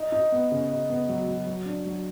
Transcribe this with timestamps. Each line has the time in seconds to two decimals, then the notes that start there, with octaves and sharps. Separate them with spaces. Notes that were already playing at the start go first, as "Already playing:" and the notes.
Already playing: D#4
0.12 D#4
0.32 B3
0.52 C#3
0.70 D#4
0.90 B3
1.09 F#3
1.27 F#3
1.46 F#3
1.65 D4
1.85 F#3